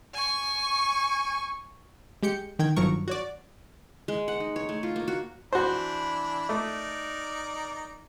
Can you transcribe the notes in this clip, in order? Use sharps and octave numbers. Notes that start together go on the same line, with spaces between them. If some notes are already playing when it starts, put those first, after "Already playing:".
G#5 C#6
G#3 G4 G6 C#7
D#3 G5 G#6
G1 D#3 F3 F#3 A#4 C#6
F#4 C#5 D5
G#3
F#5
D#4
C#5
A3
F4
A#3
F#4
E3 D4 F#4 C5 B5
A3 D#4 A#4 D5